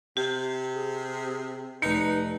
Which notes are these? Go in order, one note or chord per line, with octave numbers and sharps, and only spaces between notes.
C3 G4
G#4
F1 D#4 B4 C#7